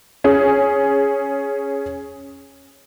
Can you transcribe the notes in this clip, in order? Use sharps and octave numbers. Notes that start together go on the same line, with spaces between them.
C#4 G#4